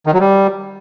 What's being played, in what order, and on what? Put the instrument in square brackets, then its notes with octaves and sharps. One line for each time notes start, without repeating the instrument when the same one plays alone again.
[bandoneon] D#3
F#3
G3